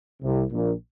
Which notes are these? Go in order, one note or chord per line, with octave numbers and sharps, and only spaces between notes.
C2 C3
A#1 A#2